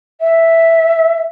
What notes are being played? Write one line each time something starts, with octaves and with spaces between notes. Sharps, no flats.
E5